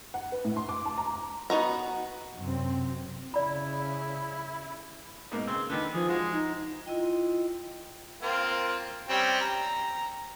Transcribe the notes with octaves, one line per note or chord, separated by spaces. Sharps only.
F#5
B4
A2
C6
D6
A5
A#5
A#5
B3 D#4 F#4 A#5
F#2 C3 F#3 C4
C#3 E4 D5 B5
G#2 B2 A#3
C#3 C4
D3 D#3 B4
F3 G#4
G#3 F#4 G#4
D#4
E4 F4 D#5 G5
A#3 C4 F4
G3 C4 C#4
A#5